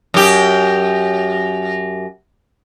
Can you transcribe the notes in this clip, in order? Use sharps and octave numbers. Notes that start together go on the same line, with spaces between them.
F#2 G4